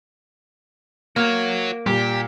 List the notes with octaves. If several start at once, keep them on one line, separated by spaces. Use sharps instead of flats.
A#3 F#4 C#5
A#2 G3 G4